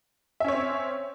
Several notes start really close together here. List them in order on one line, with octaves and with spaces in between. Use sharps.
E5 C#4 C#5 C4